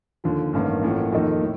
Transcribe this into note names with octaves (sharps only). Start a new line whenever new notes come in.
D#2 D3 F3
A1 G2 D#3 A#3
A1 A2 F3 A#3
F2 D#3 A#3 D#4 A4
A2